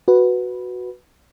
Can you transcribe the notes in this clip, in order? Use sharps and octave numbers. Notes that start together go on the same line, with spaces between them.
F#4 B4